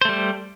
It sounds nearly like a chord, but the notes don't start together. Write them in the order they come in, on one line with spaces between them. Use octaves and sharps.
C5 A3 G3